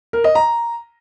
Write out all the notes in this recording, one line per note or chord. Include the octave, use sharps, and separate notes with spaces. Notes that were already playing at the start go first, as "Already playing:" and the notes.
A#4
D#5
A#5